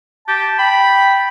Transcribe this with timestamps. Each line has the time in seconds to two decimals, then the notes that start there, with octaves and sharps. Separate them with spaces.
0.28 G4 A5
0.59 G5 B5